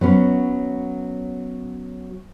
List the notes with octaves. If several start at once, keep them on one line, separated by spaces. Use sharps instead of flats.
F#3 B3 C#4